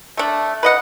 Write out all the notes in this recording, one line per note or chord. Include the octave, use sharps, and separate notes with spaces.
A3 D4
B4 D#5 F#5